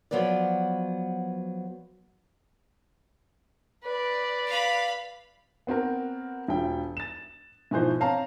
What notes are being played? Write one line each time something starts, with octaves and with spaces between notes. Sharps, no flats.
F3 F#3 B3 B4 D5
B4 D5
F5 B5
B3 C4 F#4 A#4
E1 F4 G5
A6 E7
G#2 B2 E3 F3 C5
C4 C#5 F5 A5 A#5